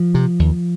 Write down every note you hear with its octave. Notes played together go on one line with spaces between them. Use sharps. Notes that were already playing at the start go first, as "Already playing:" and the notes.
Already playing: F3
C3
D#2